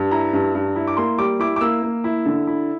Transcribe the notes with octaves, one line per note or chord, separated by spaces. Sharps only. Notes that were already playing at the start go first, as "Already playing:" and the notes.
Already playing: G2
E4 A#5
G2
G2
E4
D6
A#3 C6
G3 D6
E4 D6
D6
A#3 E6
A#3
E4
D3
E4